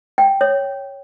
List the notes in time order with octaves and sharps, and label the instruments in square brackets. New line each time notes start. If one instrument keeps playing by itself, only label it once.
[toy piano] G5
C#5